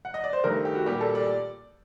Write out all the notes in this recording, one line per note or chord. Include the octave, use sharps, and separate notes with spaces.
F#5
D#5
D5
C5
G2 D#3 A3 A#4
G4
F#4
A#2 G3 A#3 G4
A4
D5